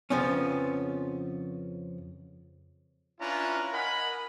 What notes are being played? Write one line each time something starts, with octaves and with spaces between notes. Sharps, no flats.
F2 C#3 F3 B3 C#4
C#4 D4 E4 F4 B4 A#5
A#4 D#5 F#5 G#5 B5